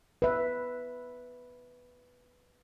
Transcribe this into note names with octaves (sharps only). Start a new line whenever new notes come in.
B4 E5